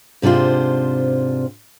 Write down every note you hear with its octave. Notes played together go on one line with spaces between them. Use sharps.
G#2 C3 D4 F4 C5